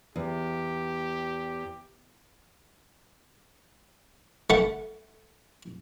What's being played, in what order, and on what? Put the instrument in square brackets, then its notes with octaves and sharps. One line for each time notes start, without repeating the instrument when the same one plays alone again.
[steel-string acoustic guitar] E2 [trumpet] G4
[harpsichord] A3 F#5